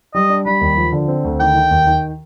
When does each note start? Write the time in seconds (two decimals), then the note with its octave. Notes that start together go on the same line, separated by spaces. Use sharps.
0.15 G3 D#5
0.29 D4
0.46 G3 B5
0.61 D#2
0.77 F3
0.92 D3
1.08 C4
1.24 D2
1.40 D#3 G5
1.55 D#3
1.71 D#2
1.87 D#3